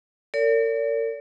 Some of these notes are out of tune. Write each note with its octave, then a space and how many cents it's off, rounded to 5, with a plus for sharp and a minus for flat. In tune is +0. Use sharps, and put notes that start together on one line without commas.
A#4 -45 D5 -45